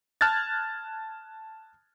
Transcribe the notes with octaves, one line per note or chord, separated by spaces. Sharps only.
A5 F6 F#6 G#6 A6